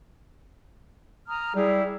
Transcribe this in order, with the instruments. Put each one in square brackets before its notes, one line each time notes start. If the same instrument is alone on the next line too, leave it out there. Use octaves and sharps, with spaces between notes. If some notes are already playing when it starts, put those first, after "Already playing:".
[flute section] A#5 D#6 F6
[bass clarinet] G3 [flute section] E4 G#4